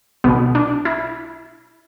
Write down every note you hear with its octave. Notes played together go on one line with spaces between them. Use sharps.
B1 B2 B3
D4
E4